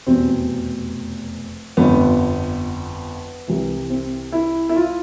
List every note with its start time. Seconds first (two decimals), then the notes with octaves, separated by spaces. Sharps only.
0.07 F1 E2 B2 C4
1.77 G1 F2 D3 B3
3.48 C2 C3 E3
3.90 C4
4.32 E4
4.69 E4
4.76 F4